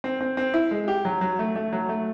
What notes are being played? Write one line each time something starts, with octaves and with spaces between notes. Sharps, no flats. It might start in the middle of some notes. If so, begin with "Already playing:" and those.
C4
C4
C4
E4
G#3
G4
F#3
F#3
A3
A3
F#3
A3